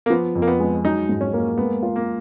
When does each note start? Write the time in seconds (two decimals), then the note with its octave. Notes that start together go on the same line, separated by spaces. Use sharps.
0.06 A#3
0.10 F3 B3
0.35 F2
0.42 A#3
0.48 B3
0.60 G#3
0.85 F#3 D#4
1.09 G#2
1.21 C#4
1.33 A#3
1.58 G#3 B3
1.83 F4
1.96 A#3